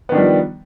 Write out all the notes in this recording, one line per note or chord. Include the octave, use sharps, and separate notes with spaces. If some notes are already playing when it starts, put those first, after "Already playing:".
D#3 F3 G3 B3 D4